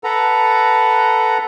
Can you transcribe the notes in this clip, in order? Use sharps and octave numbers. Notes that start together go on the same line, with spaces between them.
A4 B4 F#5 A#5